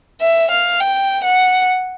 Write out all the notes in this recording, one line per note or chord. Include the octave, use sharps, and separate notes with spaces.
E5
F5
G5
F#5